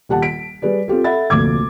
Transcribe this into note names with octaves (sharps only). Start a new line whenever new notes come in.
D#1 G4 F#5 A5
B6 D7
G3 G#4 B4 D5
C4 F4 G4 A4
A4 E5 F#5 B5 A6
F1 D2 A#2 D6 G#6